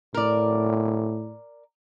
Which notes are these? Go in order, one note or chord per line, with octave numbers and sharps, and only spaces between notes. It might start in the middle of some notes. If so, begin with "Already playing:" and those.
A2 A#4 D5